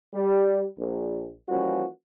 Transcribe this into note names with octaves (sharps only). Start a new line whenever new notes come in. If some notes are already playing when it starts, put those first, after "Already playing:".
G3
A#1
E3 F3 G3 A#3 C#4 F#4